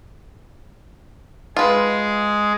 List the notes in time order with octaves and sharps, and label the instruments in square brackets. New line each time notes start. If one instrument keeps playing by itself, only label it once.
[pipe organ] G#3 G#4 [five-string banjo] F4 B4